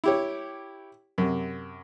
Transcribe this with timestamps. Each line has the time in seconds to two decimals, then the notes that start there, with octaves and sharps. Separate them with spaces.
0.04 E4 G4 C#5
1.18 F#2 C3